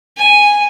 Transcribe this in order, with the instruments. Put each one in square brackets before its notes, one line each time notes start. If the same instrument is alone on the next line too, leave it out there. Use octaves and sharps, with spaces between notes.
[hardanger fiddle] G#5